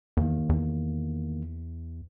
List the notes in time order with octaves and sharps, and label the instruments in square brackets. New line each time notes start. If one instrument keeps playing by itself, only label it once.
[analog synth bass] E2 [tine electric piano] D#3 A#3
[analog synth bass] E2